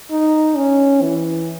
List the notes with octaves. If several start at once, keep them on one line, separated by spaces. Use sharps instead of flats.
D#4
C#4
E3